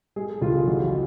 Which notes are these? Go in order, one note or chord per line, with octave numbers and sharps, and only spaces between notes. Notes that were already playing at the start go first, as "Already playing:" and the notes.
G#3 G#4
A4
C#2 F4
G#4
A1 F#4